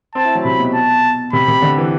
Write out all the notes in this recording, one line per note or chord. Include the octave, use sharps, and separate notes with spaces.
C4 A5
E4
F#3
C3 B5
B2
A5
C3 B5
C3
D3
E3